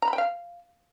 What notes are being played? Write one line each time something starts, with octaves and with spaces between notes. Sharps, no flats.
A#5
B5
G5
F5